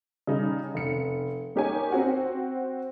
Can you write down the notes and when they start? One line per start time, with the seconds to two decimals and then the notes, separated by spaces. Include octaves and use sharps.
0.27 C#3 G3 D#4
0.74 F1 C#7
1.56 A#3 D#4 G4 A#4 C#5 G#5
1.92 C4 F#4 F#5